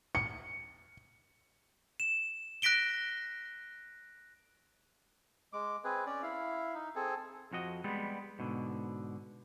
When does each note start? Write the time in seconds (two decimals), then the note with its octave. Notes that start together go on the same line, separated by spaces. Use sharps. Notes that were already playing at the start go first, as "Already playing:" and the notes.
0.15 C#7
2.00 E7
2.62 F#6 A#6 B6 D7 G7
5.53 G#3 D6
5.84 C4 G#4 B4
6.06 C#4 D5
6.23 E4 F5
6.75 D#4
6.95 C4 G#4 A4
7.51 F2 F3 F#4 D#5
7.84 G3 G#3 B3
8.39 G#2 B2 D3